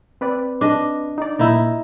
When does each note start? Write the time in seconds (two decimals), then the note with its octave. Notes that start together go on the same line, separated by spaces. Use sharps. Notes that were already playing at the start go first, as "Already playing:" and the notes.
0.21 C4 B4 D5
0.61 D4 D#5
1.18 D#4 D5
1.39 A#2 D#4 E4